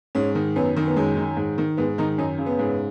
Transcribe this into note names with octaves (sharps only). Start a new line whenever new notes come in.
G#2 C#4
D#3
F#2 B3
D#3
B3
F#2 G#3
D#3
G#2
D#3
G#2 B3
D#3 D#4
F#2 D#4
C#3
B3
G#2